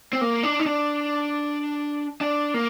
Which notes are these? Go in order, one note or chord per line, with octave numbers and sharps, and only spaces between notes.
C4
A#3
D4
D#4
D4
D4
A#3